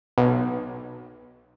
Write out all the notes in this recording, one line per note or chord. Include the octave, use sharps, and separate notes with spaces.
B1